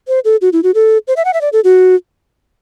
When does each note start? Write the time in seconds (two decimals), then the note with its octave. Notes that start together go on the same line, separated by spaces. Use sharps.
0.08 C5
0.25 A4
0.42 F#4
0.53 E4
0.63 F#4
0.75 A4
1.08 C5
1.17 E5
1.25 F#5
1.34 E5
1.41 D5
1.53 A4
1.64 F#4